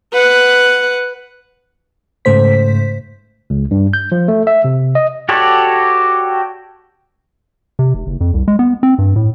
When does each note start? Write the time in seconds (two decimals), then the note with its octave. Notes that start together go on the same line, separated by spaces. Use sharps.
0.13 B4 F#5
2.25 G#2 C#3 A3 C5 B6
3.50 C#2
3.71 G2
3.93 G6
4.12 F3
4.28 A3
4.47 E5
4.64 C3
4.95 D#5
5.29 F#4 G4 A4 C#5 D5
7.79 C3
7.94 F1
8.07 F#1
8.21 F2
8.34 C2
8.48 G#3
8.59 B3
8.83 C4
8.99 G2
9.16 A2